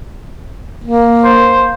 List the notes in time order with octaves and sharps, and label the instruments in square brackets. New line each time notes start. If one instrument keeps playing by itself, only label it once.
[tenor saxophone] A#3
[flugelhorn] C5